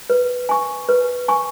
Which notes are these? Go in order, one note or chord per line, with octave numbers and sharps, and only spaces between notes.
B4
G#5 C#6
B4
G#5 C#6